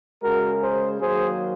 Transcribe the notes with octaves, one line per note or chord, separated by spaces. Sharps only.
C#3 G#3 F#4 A#4
G#4 C5
D#3 F#3 A#3 G#4 C5